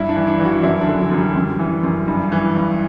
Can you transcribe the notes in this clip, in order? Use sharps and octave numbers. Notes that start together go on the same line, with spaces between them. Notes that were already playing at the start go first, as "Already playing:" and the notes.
Already playing: G2 E4
D4
E3
D4
E3
F#4
F#2 E4
D4
D3
F#3
F#2
G3
F#2
E3
F#2
G2
E3
G2